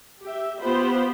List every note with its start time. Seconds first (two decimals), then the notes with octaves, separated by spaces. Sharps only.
0.21 G4 E5
0.58 B3 F4 G4 C5 B5